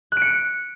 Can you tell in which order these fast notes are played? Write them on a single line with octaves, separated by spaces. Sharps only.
F#6 D7 C#7